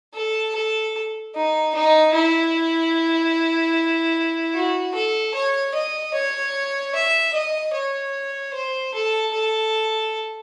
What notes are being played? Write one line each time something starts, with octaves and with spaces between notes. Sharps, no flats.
A4
A4
D#4
D#4
E4
F#4
A4
C#5
D#5
C#5
E5
D#5
C#5
C5
A4
A4